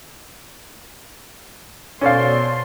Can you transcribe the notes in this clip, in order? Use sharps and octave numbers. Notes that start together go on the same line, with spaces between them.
B2 C#4 A4 C5 D5 F5 C6